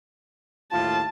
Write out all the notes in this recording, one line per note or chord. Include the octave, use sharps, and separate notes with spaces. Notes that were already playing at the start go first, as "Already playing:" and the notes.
D#2 A2 F4 A5